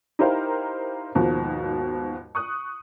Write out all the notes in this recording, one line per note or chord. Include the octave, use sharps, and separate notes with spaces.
D#4 E4 G4 A#4 C5 F5
D#2 G#2 B2 F3
C#6 D#6 F#6